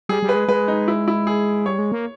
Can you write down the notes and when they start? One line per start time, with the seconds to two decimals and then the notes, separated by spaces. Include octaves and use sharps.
0.09 G3 G#4
0.22 G3
0.29 B4
0.35 G#3
0.48 G#3 B4
0.68 D#4
0.88 E4
1.08 E4
1.27 G#4
1.66 G3 C#5
1.79 G#3
1.92 A#3